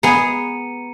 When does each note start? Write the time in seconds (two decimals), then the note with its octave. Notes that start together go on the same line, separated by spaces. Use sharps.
0.03 B3 G#4 A#5 C#7 D#7